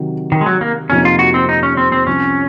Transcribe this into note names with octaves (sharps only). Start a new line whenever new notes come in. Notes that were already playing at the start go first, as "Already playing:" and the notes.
Already playing: C3 D#3 F#3
D#3
G#3
F#3
A#3
F2 C3 F3 A#3 C#4 D#4
F4
F#4
C4
D#4
C#4
C4
C4
C2 C3 F3 C#4